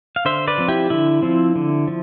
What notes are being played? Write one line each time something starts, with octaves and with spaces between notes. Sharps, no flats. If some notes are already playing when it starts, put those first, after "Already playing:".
F5
D3 C5 E5
B4 D5
F3 C4
E4 G4
D3 E4
F3 C4
D3
F3